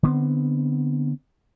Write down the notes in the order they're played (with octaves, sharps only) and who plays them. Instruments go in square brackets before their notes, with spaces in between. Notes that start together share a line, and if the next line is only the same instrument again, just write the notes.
[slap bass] D3 B3 C4